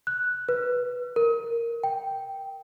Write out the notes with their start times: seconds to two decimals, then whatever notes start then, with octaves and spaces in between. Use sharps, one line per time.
0.07 F#6
0.49 B4
1.16 A#4
1.84 G5